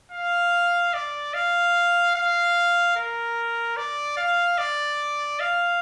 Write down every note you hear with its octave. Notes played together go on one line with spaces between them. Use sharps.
F5
D5
F5
F5
A#4
D5
F5
D5
F5